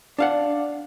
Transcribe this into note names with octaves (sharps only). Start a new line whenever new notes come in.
D4 F5 F#5